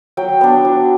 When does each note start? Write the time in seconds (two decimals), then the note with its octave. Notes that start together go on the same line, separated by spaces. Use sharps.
0.17 F#3 G5
0.41 B3 D4
0.65 F#3